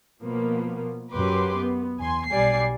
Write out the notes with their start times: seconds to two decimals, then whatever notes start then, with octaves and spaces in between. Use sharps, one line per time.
0.21 B2 F3 A#3 B3
1.13 F#2 F#3 G4 B4 C6 D6
1.57 B3
1.98 E2 G#5 C6
2.29 B1 G3 D5 G#5 C7